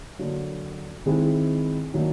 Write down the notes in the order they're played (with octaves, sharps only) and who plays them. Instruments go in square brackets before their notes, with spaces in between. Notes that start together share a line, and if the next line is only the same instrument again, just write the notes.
[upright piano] D3 F#3 A#3
D#3 G#3 C4 E4
D#3 F#3 A#3 D4